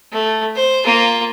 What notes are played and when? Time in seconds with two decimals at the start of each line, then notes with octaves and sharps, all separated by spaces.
0.12 A3
0.55 C5
0.85 A#3 F4